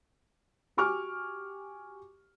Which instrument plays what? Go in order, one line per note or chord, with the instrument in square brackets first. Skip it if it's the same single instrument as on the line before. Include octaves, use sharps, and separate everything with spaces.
[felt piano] F#4 G4 G#5 C#6 D6 F6